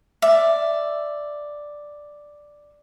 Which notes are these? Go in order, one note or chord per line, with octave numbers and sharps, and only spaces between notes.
D5 E5